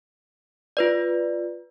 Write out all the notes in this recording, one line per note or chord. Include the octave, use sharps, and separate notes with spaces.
F4 B4 D5